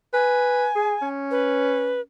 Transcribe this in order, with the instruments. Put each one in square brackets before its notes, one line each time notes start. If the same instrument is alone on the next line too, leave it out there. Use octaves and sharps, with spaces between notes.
[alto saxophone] B4 [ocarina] G#5
[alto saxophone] G#4
C#4
[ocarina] B4